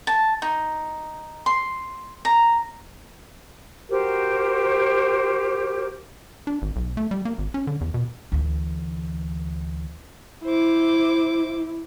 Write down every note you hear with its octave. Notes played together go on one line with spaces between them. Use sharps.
A5
D#4
C6
A#5
F#4 G4 A#4 C5
D4
G#1
B1
A3
G3
A#3
G#1
C#4
D3
E2
B2
D2 E3
E4 C5 D6